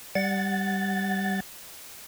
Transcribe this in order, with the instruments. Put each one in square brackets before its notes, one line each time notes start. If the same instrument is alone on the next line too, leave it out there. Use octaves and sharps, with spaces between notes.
[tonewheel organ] G3 F#5 A6